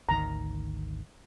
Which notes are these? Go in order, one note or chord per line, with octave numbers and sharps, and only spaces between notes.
G#1 D2 D#3 A#5